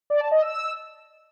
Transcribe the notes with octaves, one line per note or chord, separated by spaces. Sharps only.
D5
A5
D#5
E6